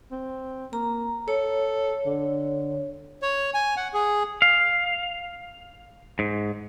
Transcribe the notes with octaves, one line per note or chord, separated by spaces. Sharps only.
C4
A#3 A#5
A4 C#5
D3
C#5
G#5
F#5
G#4
F5
G#2